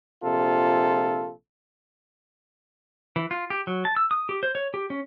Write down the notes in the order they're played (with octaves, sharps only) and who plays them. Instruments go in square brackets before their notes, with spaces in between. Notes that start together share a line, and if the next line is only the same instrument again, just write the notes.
[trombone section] A#1 C3 F4 A4
[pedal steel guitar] E3
F4
G4
F#3
A5
E6
D#6
G4
C5
C#5
G4
C#4